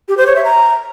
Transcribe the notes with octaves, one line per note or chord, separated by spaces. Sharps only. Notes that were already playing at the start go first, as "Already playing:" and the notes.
G4
C5
C#5
E5
A#5